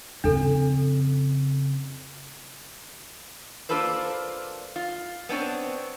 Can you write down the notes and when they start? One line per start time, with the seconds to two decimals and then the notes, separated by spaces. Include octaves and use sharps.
0.24 F2 C#3 D4 A4
3.69 A#3 D4 F4 A4 B4 C5
4.76 F4
5.29 B3 C4 D4 C#5